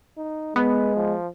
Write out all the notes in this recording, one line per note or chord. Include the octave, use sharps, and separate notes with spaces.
D#4
G#3 B3 B4
F3